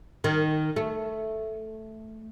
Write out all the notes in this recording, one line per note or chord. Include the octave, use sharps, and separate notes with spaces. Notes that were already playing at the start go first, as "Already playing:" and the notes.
D#3
A3